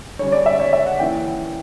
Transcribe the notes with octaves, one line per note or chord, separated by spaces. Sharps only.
D3 G3 C#4 C#5
D5
E5
C#5
E5
F#5
E3 A#3 C#4 G5